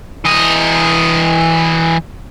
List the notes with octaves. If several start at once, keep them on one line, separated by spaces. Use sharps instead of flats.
E3 D#5